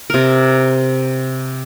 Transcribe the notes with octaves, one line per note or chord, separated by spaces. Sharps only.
C3 A#4